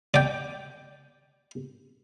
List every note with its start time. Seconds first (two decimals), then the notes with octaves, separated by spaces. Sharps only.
0.14 D5 G5